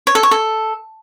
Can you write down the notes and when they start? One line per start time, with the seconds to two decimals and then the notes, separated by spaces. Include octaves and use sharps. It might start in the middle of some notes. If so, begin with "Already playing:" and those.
0.07 C#5
0.15 A4
0.23 C#5
0.31 A4